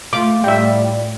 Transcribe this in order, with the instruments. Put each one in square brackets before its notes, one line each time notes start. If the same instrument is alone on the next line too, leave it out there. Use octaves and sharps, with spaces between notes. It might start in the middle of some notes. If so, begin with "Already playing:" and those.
[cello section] A3 [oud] F4 [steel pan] D6
[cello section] A2 [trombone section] G3 [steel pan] E5 G5